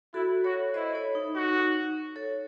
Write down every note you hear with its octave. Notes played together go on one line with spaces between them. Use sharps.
E4 F#4 A4
F#4 A4 C#5
E4 C5 D#5
A4 C#5
D#4
D#4 F#4
A4 C#5